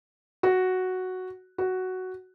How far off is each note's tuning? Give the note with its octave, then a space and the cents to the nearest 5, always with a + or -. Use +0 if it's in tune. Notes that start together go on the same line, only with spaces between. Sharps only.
F#4 +0
F#4 +5